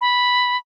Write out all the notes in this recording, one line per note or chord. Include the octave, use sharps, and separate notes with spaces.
B5